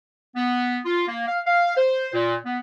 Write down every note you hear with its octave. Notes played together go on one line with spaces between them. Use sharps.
B3
F4
A#3
F5
F5
C5
A#2
B3